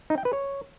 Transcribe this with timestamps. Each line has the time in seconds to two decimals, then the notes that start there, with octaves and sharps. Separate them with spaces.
0.10 D#4
0.18 G5
0.25 B4
0.33 C#5